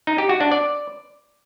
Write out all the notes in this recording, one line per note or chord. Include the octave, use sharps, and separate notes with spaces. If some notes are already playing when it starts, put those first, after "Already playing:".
D#4
G4
F#4
D4
D5